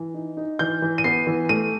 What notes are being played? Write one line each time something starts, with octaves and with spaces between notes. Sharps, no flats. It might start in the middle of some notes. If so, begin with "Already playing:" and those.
Already playing: E3
D#4
D#4
E3 G6
E3
D#7
B3 C7
E3
A3 D#7